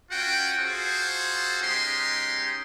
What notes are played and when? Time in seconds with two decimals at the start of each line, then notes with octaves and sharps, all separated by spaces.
0.11 C#4 F4 F#4 F#5 G5
0.58 F4 F#4 G#4 A4 C5
1.62 G#3 C#4 D#4 G4 C6